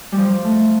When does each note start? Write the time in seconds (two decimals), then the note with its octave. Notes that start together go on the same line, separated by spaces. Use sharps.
0.12 F3 G3
0.44 A3